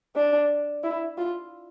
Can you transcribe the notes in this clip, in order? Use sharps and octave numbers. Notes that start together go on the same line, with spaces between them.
D4
E4
F4